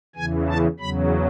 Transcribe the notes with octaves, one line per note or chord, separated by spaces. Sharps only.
E2 C#3 E3 G#5
A5
E2 C#3 F#3 B5